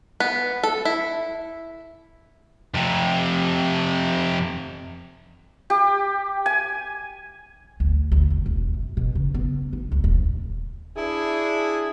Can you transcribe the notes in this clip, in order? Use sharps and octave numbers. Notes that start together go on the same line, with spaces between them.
B3
A4
E4
F2 C3
G4
G#5
D2
D2
D#2
E1
F#2
B2
C#3
B3
D#4
C#2
D#1
D4 E4 G#4